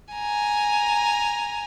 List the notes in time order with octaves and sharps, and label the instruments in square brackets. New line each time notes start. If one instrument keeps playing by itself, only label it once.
[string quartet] G#5 A#5